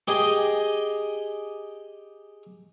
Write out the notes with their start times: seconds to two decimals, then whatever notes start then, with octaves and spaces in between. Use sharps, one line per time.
0.08 G4 G#4 D#5